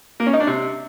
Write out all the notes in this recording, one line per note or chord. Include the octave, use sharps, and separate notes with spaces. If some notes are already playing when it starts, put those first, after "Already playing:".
A#3
C#4
D#4
D4
C3